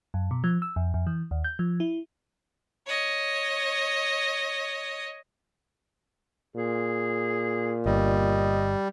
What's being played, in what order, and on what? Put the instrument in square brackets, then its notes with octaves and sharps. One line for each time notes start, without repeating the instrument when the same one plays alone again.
[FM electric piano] F#2
B2
F3
E6
F2
F2
E3
D#2
G6
F3
E4
[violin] C#5 D#5
[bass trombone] A#2 [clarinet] G#4
[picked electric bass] G1 [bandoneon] G3 [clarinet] D#5